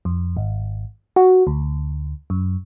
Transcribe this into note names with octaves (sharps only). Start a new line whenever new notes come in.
F2
G#1
F#4
D2
F#2